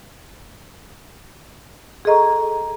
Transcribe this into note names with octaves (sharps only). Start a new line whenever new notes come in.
G#4 A4 D#5 A#5 C#6